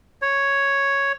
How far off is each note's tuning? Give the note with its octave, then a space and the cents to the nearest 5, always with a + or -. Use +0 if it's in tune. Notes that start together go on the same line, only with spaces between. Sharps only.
C#5 +0